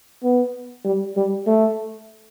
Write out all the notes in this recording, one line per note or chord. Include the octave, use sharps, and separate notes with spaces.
B3
G3
G3
A3